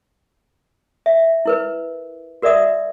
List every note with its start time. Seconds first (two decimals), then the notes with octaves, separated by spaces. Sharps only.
1.06 E5
1.46 E4 A#4 B4
2.42 F#4 A#4 D5 E5 D#6